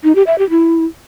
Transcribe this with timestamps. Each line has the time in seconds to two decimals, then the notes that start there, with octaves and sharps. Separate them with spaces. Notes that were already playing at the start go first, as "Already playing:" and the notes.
0.04 D#4
0.15 G4
0.27 E5
0.38 G4
0.50 E4